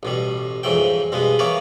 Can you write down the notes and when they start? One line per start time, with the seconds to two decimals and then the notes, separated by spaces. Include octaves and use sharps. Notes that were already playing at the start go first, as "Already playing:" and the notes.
0.03 A1 B2 G3
0.63 F2 G#2 E3 F#3 G5
1.12 G2 B2 G#3 B3
1.39 E3 A#3 B3 C#5 D5